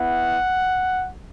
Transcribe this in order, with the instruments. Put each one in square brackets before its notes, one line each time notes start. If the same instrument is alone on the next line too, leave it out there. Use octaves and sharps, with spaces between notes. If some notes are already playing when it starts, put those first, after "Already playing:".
Already playing: [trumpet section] B3 E4 F#5